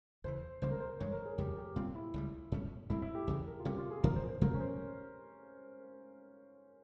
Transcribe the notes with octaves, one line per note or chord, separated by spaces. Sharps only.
E2 C#3 E3 C5
C#2 C#3 G3 A#3 C5
A#4
C5
G2 E3 G#3 C#5
A#4
G#4
F2 C#3 G3 G4
G4
A#2 G3 C4 F4
E4
C#2 C#3 G3
G#2 G3 C#4
G#2 G3 C4 E4
E4
G4
E2 C#3 E3 G#4
A#4
F4
C3 G3 C#4 G4
F4
G#4
G#2 E3 G3 A#4
C5
C5
C3 F3 G#3 C4 A#4
C#4
C5